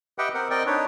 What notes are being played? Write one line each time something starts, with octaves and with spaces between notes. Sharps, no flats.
G4 B4 D#5 E5 F#5 G5
C4 A#4 F#5
C4 A#4 D5 D#5 G5
D4 D#4 B4 C#5